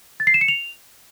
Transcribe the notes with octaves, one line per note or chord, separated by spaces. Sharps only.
A6
C7
E7
C#7
F7